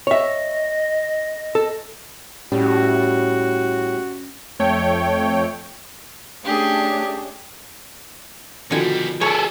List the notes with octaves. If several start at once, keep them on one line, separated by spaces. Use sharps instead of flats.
C#5 D#5 E5
A4
A2 G3 C#4 F#4
F2 A3 C#5 G5
A3 C#4 D4 G4 G#4
G#2 B2 D3 D#3 F3 G3 G#5
G#4 A4 C#5 D5 E5